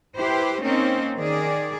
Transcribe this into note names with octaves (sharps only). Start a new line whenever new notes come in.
E4 G4 B4 C5
A#3 C4 C#4 D#4
D#3 G#4 D5